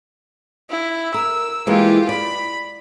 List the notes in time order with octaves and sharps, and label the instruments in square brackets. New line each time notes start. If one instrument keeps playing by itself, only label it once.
[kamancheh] E4
[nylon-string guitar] A#4 [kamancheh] E6
[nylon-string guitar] E3 G#3 A#3 [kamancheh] F4 G4
[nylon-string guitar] D5 [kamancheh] B5